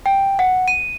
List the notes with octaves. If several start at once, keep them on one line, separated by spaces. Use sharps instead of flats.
G5
F#5
D#7